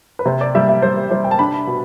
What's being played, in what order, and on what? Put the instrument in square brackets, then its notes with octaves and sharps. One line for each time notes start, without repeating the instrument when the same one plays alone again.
[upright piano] B4
C3 C5
D5
G3 E5
E5
G3 C5
G3 C5
G5
A5
D4 B5
B2